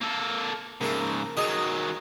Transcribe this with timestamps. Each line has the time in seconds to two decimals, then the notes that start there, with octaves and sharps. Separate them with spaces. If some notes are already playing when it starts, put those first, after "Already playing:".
0.01 A#3 A4
0.81 G#2 C#3 A#3 A4
1.37 D#3 F#3 G#4 D#5